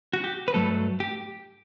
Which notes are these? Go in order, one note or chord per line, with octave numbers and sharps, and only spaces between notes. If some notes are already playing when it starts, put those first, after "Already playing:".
F#4
G4
B4
G2 F#3 A3 A4
G4